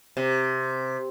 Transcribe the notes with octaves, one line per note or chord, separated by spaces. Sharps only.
C3